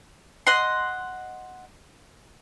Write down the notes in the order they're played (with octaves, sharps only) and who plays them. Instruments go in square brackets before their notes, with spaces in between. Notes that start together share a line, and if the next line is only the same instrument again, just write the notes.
[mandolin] D#5 F#5 C6